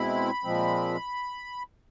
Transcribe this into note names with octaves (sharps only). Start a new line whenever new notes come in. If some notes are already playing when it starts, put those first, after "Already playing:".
Already playing: B2 G#3 C4 E4 B5
A#2 F3 G#3 C4